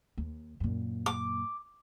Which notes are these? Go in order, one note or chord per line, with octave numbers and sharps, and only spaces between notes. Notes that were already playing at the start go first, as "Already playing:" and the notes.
D#2
F#2 A#2
D6